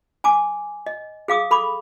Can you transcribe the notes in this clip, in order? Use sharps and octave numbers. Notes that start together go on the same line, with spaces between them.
G#5 A5 D6
D#5
G#4 F5 D6 D#6
A4 B5 C#6 D6